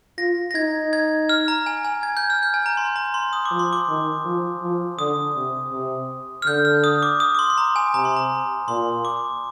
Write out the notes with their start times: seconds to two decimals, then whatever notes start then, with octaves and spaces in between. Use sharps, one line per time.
0.18 F4 A#6
0.51 A#6
0.55 D#4 G#6
0.93 G#6
1.29 F6
1.48 A#5
1.66 G#5
1.85 G#5
2.03 G#6
2.17 G6
2.30 F6
2.43 G6
2.54 G#5
2.66 A#5
2.77 C6
2.96 A#5
3.14 C6
3.33 D#6
3.45 D6
3.51 F3
3.59 C6
3.73 D6
3.89 D#3
4.25 F3
4.62 F3
4.99 D3 D#6
5.36 C3
5.72 C3
6.42 F6
6.47 D3 G6
6.65 F6
6.84 D#6
7.03 D6
7.20 D#6
7.35 D6
7.39 C6
7.50 C6
7.58 A#5
7.76 G#5
7.94 C3 A#5
8.05 C6
8.16 A#5
8.68 A#2 C6
9.05 D6